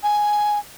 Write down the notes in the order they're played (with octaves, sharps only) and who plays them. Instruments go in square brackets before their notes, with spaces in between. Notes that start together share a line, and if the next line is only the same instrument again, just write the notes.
[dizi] G#5